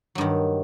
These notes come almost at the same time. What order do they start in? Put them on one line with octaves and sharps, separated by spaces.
F#3 G2 D#3